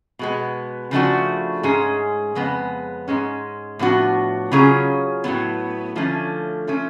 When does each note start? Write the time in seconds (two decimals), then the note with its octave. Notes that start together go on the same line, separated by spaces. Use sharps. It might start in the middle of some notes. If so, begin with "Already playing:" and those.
0.19 B2 G#3 B3
0.91 C#3 F3 A3 D4 F#4
1.63 G#2 G#3 C#4 G#4
2.35 F2 C#3 G#3 B3
3.08 G#2 G#3 C#4
3.79 A2 F3 B3 D4 F#4
4.51 C#3 F#3 C#4 F4 G#4
5.24 A2 F#3 B3
5.95 D3 F3 A3 C#4
6.67 F3 A3 C#4